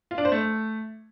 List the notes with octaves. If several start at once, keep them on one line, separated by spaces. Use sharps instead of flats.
F4
D4
C5
A3